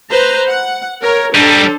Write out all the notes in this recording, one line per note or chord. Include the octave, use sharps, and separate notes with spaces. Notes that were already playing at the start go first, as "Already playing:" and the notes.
B4 C5 A#5
F#5
A#4 C#5
G3 D4 D#4 A4 C5